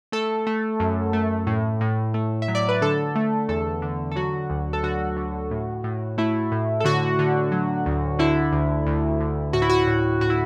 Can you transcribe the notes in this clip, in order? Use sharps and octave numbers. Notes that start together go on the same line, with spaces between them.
A3 A4
A3
F#2
A3
A2
A2
A3
E5
F#3
D5
B4
D3 A4
A3
E2 A4
D3
A4
F#3 F#4
D2
A4
D3 F#4
D3
A2
A2
A3 E4
A2
A4
D3 F#4
D3
F#3
D2
D3 E4
D2
D2
D2
A2 F#4
E4
F#4
A2
A2 F#4
E4